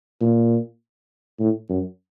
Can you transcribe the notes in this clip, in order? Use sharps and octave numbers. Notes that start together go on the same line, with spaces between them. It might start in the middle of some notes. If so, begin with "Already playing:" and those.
A#2
A2
F#2